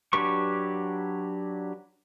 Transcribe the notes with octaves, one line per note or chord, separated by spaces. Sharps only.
F#3 D4 G4 B4 C#6